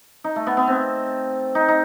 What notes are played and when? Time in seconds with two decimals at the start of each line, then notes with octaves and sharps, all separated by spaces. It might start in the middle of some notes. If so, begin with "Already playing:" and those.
0.24 D#4
0.36 A3
0.47 B3
0.57 B3
0.67 C4
1.55 D#4
1.68 D#4